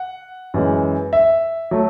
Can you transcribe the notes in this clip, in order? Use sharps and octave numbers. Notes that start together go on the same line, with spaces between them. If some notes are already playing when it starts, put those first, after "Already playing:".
Already playing: F#5
F#2 E3 G#3
E5
F#3 A3